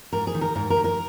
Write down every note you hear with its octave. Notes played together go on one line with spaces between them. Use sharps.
G#2 A#4
G#4
D#3
A#4
G#2 A#4
A#4
D#3
A#4